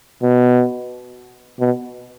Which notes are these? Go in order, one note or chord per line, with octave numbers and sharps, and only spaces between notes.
B2
B2